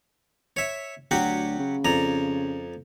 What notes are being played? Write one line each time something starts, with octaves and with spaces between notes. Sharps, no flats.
C#5 E5
D2 F#3 F#4 G4
C#3
F2 D5 A#5